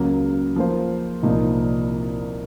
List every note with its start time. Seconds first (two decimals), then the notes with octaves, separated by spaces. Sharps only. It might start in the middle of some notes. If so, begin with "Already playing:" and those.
Already playing: C#2 C#3 F#3 A#3
0.56 F3 A#3 F4 C5
1.23 C2 A#2 F3 A#3 D#4